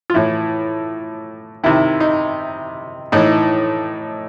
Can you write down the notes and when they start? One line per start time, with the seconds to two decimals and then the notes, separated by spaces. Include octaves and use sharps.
0.10 F4
0.14 A2 E3 E4
1.64 C3 D#3 E4
2.00 D#4
3.12 A2 E3 D#4